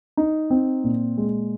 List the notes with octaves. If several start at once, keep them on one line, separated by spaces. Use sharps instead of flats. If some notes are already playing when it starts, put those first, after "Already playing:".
D#4
C4
A#2
G#3